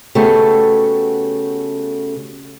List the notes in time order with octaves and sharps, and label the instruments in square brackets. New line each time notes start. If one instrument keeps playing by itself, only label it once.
[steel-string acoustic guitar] C#3 A3 B3 F#4 G4 A4